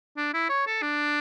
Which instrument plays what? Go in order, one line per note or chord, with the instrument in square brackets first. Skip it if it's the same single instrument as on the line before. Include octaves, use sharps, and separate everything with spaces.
[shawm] D4
E4
C#5
A4
D4